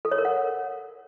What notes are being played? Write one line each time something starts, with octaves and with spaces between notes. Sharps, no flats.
A4
C#5
A#4
F#5